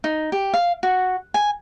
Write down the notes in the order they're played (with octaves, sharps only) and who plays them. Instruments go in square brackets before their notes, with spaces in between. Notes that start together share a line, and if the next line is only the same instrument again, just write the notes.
[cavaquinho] D#4
G4
F5
F#4
G#5